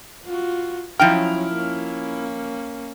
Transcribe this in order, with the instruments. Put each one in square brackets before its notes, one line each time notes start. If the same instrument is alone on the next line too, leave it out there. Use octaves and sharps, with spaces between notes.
[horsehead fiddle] F4 F#4
[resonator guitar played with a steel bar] F3 D#4 G5 [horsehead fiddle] F#3 C#4 [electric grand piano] E4 F6
[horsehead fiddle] A#3 C#4